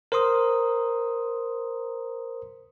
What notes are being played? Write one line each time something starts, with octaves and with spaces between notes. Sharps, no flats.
A#4 C5 A#5 C6 D#6